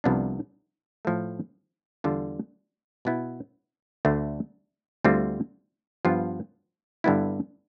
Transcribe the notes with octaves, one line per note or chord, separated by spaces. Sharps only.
C2 C3 F3 B3 D4
A2 F3 A3
E2 D3 G3 D4 F4
B2 B3 E4
D2 D3 A3 D4
D2 D3 G3 C4 F4
G2 F3 B3 F4
G2 D3 G3 B3 E4